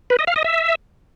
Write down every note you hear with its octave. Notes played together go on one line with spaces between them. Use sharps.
B4
D#5
F5
D#5
E5